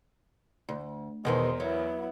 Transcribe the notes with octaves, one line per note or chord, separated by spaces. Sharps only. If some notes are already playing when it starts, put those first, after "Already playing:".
D2
E2 B2 D#3 E3 G#3 A#4 C5
F#3 B3 E4